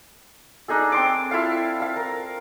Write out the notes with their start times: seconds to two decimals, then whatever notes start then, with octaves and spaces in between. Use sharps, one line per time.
0.68 D4 D#4 G#4 A4
0.92 C4 C6 D6
1.31 E4 F4 A4 F5
1.80 F5 A5
1.96 A#4